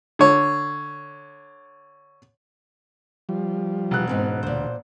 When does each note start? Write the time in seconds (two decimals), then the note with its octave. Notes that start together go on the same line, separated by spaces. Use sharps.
0.19 D3 C#5
3.29 F3 G3
3.91 E1 F#6
4.08 G#2 B2 C4 C#4
4.43 D2 A#2 C5